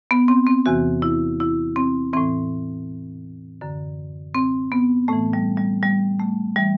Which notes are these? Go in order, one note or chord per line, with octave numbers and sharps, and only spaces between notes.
B3
C4
C4
E2 C3 E3 F#4
E4
E4
C4
A2 E3 C4
F#2 D3
C4
B3
A2 E3 A3
G3
G3
G3
A3
E3 G3